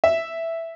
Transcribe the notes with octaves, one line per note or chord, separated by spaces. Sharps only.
E5